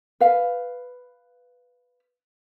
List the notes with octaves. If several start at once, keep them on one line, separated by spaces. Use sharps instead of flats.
B4 F5